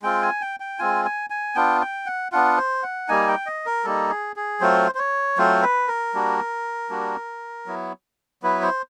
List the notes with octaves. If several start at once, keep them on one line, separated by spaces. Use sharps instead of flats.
G#3 C4 F4 G5
G#5
G5
G5
G#3 C4 F4 G#5
G#5
G#5
B3 D4 F4 G5
G5
F#5
B3 D4 F4 F#5
C5
F#5
G3 A#3 D#4 G#5
G5
D#5
A#4
G3 A#3 D#4 A4
G#4
G#4
F#3 A3 C4 F4 C5
C5
C#5
F#3 A3 C4 F4 C5
B4
A#4
G3 A#3 D4 F#4
G3 A#3 D4 F#4
F#3 B3 E4
F#3 B3 E4 B4
C5